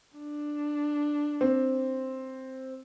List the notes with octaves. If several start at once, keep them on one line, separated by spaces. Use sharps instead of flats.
D4
C4